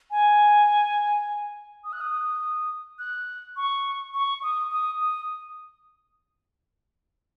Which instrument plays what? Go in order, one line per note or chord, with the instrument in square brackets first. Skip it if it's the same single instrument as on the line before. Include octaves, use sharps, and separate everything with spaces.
[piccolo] G#5
D#6
F#6
D#6
F#6
C#6
C#6
D#6
D#6
D#6